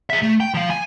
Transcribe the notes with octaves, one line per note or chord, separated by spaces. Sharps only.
G#4 E5
A3
G5
F3 F5
G#5